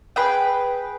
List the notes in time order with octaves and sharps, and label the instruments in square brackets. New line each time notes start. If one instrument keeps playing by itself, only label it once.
[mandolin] G#4 B4 G5